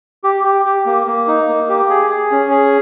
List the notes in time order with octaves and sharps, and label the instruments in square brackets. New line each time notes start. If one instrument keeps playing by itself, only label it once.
[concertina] G4
G4
G4
A#3
A#3
D#4
A#3
G4
G#4
G#4
C#4
G#4